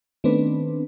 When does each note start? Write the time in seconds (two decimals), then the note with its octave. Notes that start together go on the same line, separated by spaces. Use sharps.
0.24 D#3 A3 B3 C4 D4 B4